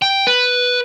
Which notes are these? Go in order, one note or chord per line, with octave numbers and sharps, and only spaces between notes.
G5
B4